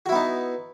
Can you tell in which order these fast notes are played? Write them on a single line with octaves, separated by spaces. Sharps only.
F#4 E4 B3 D#4